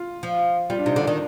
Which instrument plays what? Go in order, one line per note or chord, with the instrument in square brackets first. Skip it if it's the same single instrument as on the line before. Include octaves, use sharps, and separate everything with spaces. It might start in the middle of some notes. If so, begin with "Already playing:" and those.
Already playing: [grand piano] F4
[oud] F3
[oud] G3 [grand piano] F4
[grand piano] D4
[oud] C3 [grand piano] D#4
[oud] D3
[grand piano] D4
[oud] D#3